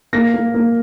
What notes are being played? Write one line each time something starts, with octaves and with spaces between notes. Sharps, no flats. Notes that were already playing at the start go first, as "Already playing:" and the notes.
A#3 A#6
A#3
A#3